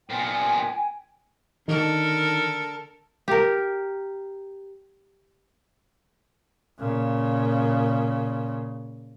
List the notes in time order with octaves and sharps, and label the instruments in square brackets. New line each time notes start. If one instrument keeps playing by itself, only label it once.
[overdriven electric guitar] A#2 B3 [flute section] G5 G#5
[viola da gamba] D3 A4 A#4 [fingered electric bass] D#3
[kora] G4 A#4
[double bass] A#2 C#3